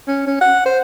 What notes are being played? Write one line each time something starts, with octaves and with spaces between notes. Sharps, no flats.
C#4
C#4
F#5
C5